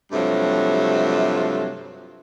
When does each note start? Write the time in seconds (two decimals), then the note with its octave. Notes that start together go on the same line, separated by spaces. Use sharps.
0.12 G2 C3 F3 F#3 A3